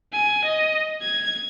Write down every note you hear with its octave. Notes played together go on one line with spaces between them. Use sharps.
G#5
D#5
G#6